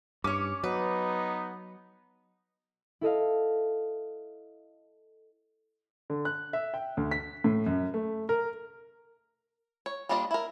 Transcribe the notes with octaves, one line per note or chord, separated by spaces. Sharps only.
G2 C#4 C#5 D6
F#3 B3 D#4 B4
E4 A4 D#5 F5
D3
F#6
E5
G5
D2
B6
A2
F#2
A3
A#4
C#5
G3 A#3 D4 F4 D#5
E4 A#4